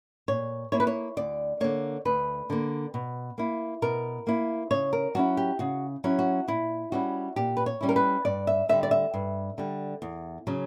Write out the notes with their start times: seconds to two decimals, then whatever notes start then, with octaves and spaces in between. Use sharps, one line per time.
0.28 A#2 C#5
0.72 A#3 E4 C#5
0.80 B4
0.87 C#5
1.17 D2 D5
1.60 D3 A#3 C#5
2.05 D2 B4
2.50 D3 A#3
2.94 B2
3.38 A#3 E4
3.82 B2 A#4
4.27 A#3 E4
4.71 C#3 C#5
4.93 A#4
5.15 F#3 C#4 E4 F#4
5.37 G4
5.59 C#3 F#4
6.04 F#3 C#4 E4
6.19 F#4
6.48 A#2 E4
6.92 G3 C#4 E4 F#4
7.36 A#2 G4
7.57 B4
7.66 C#5
7.81 G3 C#4 E4
7.89 A#4
7.96 B4
8.25 G2 D5
8.47 E5
8.69 D3 G3 E5
8.83 D5
8.91 E5
9.14 G2
9.58 D3 G3
10.02 E2
10.47 C#3 F#3 C#4